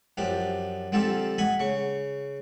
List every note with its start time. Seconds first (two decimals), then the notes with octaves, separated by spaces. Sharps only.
0.17 F#2 F3 D4 G4
0.92 D3 F3 C4 F4 G4 A4
1.38 D#5 F#5 G#5 B5
1.60 C#3 C#6